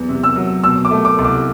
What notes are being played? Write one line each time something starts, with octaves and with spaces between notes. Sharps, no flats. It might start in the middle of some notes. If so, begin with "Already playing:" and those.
Already playing: E2 F#3 B3
C3
E6
F#3
B2 E6
D6
A3
D6
C2
D6